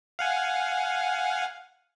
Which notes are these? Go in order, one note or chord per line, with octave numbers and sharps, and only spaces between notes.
F5 F#5 G#5